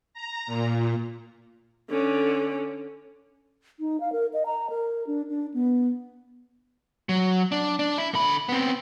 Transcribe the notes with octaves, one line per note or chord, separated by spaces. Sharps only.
A#5
A#2
D3 C#4
D#4
F5
A#4
D#5
A#5
A#4
D4
D4
B3
F#3
D4
D4
E4
D3 B5
B3 C4